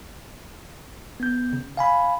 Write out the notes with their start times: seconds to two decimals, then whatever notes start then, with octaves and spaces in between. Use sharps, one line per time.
1.20 B3 G6
1.53 C#3
1.77 F5 G#5 B5